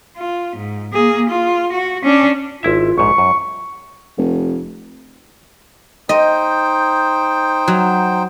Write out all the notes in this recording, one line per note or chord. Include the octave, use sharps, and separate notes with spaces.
F4
G#2
A#3 G#4
F4
F#4
C#4 D4
G#1 E4 F4 E5
A#1 G#2 C#6
F#2
F1
D#4 C5 D#5 G5
F#3